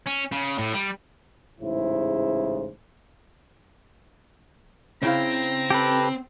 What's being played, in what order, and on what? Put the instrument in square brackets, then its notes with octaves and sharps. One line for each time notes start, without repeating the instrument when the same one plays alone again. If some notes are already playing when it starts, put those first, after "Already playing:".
[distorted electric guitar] C#4
C#3
A2
G3
[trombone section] A1 G#2 C#3 E4 C5
[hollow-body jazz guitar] C#3 E4 F5 [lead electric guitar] C4 [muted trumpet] A#5
[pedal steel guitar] G4 A4 B4